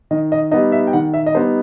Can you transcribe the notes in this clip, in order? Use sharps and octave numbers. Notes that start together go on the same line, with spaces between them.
D#3 D#5
D#5
G3 B3 D#4 D#5
E5
G5
D#3 F#5
E5
D#5
G3 B3 D#4 C5